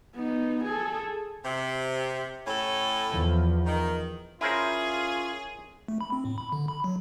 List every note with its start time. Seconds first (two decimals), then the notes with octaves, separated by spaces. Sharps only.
0.15 B3 D#4
0.64 G#4 A4
1.44 C3
2.47 A2 C#4 A4
3.11 E2 F3
3.66 D#3
4.41 C#4 E4 F4 G#4 A#4 C5
5.88 A3
6.01 B5
6.12 C4
6.25 A2
6.38 B5
6.52 D3
6.68 B5
6.84 F#3